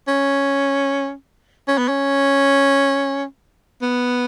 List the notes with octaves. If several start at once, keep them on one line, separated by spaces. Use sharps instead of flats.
C#4
C#4
B3
C#4
B3